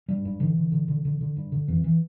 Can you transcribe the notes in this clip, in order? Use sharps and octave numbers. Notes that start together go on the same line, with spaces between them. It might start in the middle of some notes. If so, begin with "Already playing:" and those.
G2 G3
G2
D3 E3
D3
D3
D3
D3
D3
G2
D3
F2 E3
E3